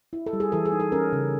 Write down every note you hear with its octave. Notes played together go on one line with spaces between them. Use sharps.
E4
A4
G3
G#4
E3 A4
G#4
D#4
A4
C#4 A#4
C#3